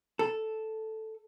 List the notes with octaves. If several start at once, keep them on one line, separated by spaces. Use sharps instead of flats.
A4